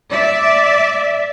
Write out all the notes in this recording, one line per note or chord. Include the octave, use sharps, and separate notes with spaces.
D5 E5